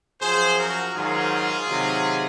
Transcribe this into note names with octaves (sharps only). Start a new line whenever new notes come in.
F#2 F3 G#4 C5
F#4 A#4
G#2 D#3 F#3 F4 G#4
C3 D#3 F#3